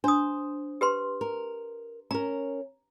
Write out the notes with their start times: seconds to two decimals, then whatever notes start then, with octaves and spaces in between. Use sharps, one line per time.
0.04 D4 C5 D#6
0.81 G4 B4 C6
1.21 A#4
2.11 C#4 A#4 A#5